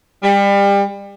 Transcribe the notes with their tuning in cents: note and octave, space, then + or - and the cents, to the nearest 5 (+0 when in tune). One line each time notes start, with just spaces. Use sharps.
G3 +30